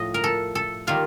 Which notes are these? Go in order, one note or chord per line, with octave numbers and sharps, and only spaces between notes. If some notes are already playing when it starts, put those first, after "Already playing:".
Already playing: A2 F3 A3 D#5
A#4
A4
A4
D#3 G3 A#3 F4